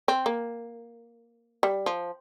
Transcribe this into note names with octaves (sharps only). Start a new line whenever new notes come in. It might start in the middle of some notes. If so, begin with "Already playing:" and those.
C4
A#3
G3
F3